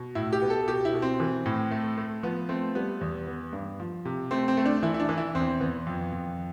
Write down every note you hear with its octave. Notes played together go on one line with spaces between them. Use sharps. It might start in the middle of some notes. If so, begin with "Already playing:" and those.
Already playing: B2
A2 E4
G4
B3
A4
B2 G4
E4
B2
C4
E3
A2
A3
A3
F3 B3
A3 C4
G3 B3
E2
B3
G2
F3
C3
A3 C4
C4
A3
D4
E3 E4
E4
D4
E3
E4
E2 C4
E2 B3
F2
F2